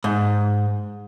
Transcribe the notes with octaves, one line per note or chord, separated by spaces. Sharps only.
G#2